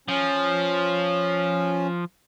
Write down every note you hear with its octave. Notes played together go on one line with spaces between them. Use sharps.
F3 C#4